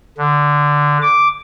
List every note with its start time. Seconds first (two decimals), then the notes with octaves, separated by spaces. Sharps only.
0.18 D3
1.02 D6